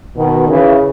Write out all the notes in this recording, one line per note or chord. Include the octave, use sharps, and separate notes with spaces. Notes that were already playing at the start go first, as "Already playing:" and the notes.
B2 D#3
C#3 E3